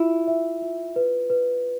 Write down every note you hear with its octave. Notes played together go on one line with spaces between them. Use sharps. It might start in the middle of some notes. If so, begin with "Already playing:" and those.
Already playing: E4 F4 E5
E5
F4
B4
B4